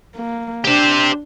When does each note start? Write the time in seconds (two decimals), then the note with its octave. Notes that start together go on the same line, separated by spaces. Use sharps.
0.16 A#3
0.65 D4 G4 C5